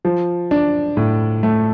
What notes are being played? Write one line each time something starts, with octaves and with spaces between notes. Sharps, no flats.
F3
D4
A2
A3